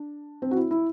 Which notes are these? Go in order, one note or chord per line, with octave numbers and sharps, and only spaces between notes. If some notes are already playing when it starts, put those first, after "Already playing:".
Already playing: D4
C4
F#4
E4
E4